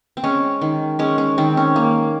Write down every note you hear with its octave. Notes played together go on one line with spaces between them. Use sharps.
C4
G#3 C#4
D#3
G#3 C#4
C#4
D#3 C4
C#4
A#3